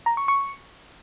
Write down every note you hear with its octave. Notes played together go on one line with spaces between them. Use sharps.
A#5
C#6
C#6